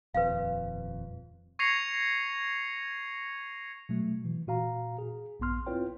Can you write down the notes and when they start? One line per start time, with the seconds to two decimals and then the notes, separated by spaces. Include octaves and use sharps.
0.14 D#1 F2 B4 F5
1.59 C#6 G#6 A#6 C7 C#7 F7
3.89 B2 F#3 A3
4.24 B2 E3
4.47 A#2 F#4 F5 A#5
4.98 G#4
5.40 A#1 G2 B3 C6 F6
5.66 C4 E4 F4 B4 C#5 G5